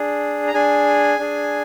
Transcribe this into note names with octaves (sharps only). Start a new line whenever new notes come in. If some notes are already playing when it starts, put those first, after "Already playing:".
Already playing: D4 G#4
A#5
D4 G#4 G#5
D4 G#4